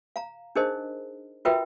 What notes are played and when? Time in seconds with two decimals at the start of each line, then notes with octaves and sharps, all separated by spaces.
0.16 F5 A#5
0.56 D4 D#4 G#4 A#4 C5 D#5
1.45 F4 F#4 A#4 B4 E5 G5